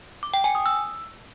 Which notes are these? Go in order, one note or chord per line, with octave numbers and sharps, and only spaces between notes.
D6
G5
G#5
D#6
E6